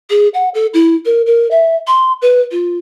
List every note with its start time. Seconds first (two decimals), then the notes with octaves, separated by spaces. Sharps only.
0.10 G#4
0.34 F#5
0.54 A4
0.74 E4
1.05 A#4
1.26 A#4
1.51 E5
1.87 C6
2.22 B4
2.51 F4